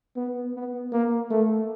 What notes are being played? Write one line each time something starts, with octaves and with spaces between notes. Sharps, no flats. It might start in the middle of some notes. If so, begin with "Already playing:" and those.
B3
B3
A#3
A3